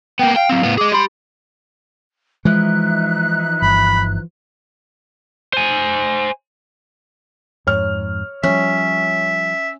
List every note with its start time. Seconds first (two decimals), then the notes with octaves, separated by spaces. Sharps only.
0.19 A#3 B3 G5
0.36 F5 G5
0.49 F#3 C4
0.63 A2 B3
0.78 G#4 D#5 D6
0.92 G4 B5 C6
2.45 E3 F3 G#3 D#4 E5 F#6
3.62 G1 B5
5.53 C5 G#5
7.67 F2 G#2 C#5 F6
8.44 F3 G3 C#4 E5